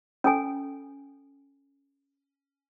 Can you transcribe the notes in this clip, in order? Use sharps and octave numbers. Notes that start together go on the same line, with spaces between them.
C#4 A4 G#5